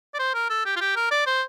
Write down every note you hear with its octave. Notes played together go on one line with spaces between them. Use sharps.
D5
C5
A#4
A4
G4
F4
G4
A#4
D5
C5